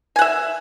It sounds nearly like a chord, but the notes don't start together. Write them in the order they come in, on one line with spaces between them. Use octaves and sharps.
G#5 F#5 E5